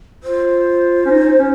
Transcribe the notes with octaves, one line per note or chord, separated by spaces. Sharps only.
F4 C5
C#4
D#4
C#4